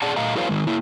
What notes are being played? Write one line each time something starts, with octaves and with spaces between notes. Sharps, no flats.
G#4 D5 F#5 A5
A#2 A3 D#5 F5 A#5
E4 F#4 A4 B4 C#5 F5
D#3 G#3
A#3 E4